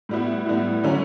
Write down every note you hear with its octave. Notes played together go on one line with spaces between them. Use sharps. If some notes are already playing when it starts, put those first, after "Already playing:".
A2 G3 B3 E4
A2 G3 B3 E4
D3 F#3 C#4